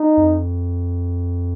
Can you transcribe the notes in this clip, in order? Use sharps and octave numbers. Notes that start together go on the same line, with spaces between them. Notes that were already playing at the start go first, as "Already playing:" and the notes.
Already playing: D#4
F2